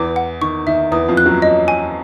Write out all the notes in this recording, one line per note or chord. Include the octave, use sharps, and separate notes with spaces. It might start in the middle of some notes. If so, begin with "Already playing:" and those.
Already playing: E2 E3 D6
F#5
D#3 C#6
D#3 E5
E2 E3 D#6
F2 F3
F#6
F#2 F#3
D#5
G#5